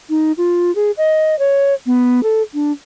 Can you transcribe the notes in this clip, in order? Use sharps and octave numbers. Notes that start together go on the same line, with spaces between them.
D#4
F4
G#4
D#5
C#5
B3
A4
D4